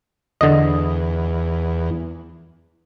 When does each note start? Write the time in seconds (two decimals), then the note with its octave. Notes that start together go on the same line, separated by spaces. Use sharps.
0.41 E2 D3 D#5